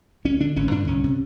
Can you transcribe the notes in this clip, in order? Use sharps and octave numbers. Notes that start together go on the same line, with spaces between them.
D2 C#4
D3 D4
G#1 C#4
G2 D3 D4
C2 C#4
C3